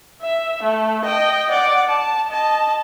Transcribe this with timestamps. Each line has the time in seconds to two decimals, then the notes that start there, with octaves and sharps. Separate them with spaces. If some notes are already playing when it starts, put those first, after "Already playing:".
0.22 E5
0.63 A3
1.05 D#5 G5
1.51 D5 F#5
1.89 A5
2.29 D#5 A5